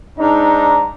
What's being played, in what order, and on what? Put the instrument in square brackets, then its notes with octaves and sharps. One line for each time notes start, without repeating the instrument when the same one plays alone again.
[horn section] G#2 D4 D#4 A#5